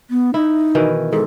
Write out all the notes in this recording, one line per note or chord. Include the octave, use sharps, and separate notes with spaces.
B3
D#4 E4
B2 D#3 E3
G#2 A4